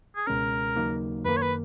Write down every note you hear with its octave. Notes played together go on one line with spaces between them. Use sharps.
G#4
C#2 B2 G#3 C#4 A#4
D#2 C#3 F#3 A#3 D#4
F#2 D#3 A#3 B4
C#5
B4